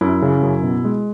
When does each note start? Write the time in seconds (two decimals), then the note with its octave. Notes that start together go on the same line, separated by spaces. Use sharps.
0.01 F#2 E4
0.22 C#3
0.42 F#2
0.63 B2
0.85 G#3